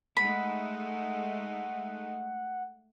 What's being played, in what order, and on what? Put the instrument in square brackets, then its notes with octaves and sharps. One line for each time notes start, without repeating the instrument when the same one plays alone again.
[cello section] G#3 A3 D#4 [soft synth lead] F#5 [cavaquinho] B5